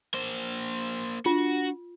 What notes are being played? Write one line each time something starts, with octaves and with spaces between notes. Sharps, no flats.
A#3 C5
D4 F4 F#4